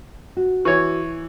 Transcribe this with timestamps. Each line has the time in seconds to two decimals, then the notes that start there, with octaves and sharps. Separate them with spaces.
0.37 F#4
0.65 E3 C#5 C#6 G#6